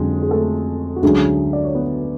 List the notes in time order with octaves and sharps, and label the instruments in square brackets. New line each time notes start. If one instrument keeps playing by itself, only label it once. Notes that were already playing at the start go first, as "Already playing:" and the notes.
Already playing: [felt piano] F2 D3 F#3 C#4 [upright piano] G#3
[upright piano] G#4
A3 A4
F#4
[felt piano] D2 D3 F#3 C#4 [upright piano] G#3 G#4
[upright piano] D5
C#5
B3 B4